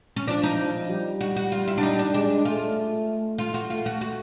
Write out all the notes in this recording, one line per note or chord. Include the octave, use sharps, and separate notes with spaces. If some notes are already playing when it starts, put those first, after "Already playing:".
C#4
F3 D4
D#4
F3
G3
F#4
F#4
F4
E4
D4
D#4
D4
G#3 D4
A3 F4
F4
F#4
A3 F4
F#4
F#4